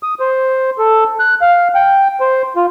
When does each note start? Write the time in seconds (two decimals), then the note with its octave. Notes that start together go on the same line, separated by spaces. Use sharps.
0.03 D#6
0.20 C5
0.78 A4
1.20 F#6
1.41 F5
1.75 G5
2.20 C5
2.56 F4